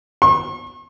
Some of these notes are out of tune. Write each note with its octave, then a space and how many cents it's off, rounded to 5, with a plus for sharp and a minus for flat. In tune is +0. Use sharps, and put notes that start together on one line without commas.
C#6 -45